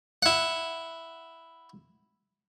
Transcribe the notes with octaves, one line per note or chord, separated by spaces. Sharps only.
E4 F#5